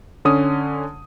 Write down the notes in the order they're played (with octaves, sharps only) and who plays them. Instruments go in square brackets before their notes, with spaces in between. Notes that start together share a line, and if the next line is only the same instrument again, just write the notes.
[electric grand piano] D3 C#4 D#6